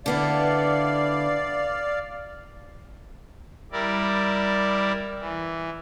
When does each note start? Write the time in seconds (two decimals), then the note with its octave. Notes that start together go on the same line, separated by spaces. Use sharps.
0.06 D3 B3 E4 D5 F5
3.72 G3 E4 A#4 D5
5.20 E3